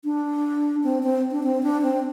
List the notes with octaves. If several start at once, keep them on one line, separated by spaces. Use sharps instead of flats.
D4
C4
C4
D4
C4
D4
C4